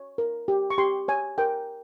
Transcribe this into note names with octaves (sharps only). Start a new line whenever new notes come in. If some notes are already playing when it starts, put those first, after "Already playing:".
Already playing: C#5
A#4
G4
C#6
G4 C6
C#5 G#5
A#4 G5